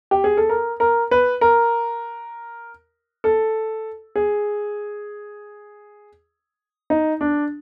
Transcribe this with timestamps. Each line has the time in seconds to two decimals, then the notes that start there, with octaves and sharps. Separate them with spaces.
0.11 G4
0.24 G#4
0.37 A4
0.49 A#4
0.80 A#4
1.11 B4
1.41 A#4
3.24 A4
4.16 G#4
6.90 D#4
7.21 D4